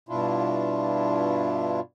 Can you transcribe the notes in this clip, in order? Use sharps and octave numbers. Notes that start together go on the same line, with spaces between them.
G2 B2 D4 E4 F4